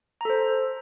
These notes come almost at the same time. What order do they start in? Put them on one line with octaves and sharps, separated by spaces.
A#5 A4 C5